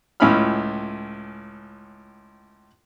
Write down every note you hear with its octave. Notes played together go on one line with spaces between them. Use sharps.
C#2 A2 C#4 F4 B5 F6